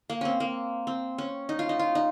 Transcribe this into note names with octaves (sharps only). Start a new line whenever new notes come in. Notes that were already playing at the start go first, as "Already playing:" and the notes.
A#3
C4 C#4
A#3
C4
C#4
D#4
F4
D#4
F4
D#4